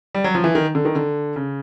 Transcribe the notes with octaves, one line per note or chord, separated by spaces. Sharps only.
G3
F#3
F3
E3
D#3
D3
D#3
D3
C#3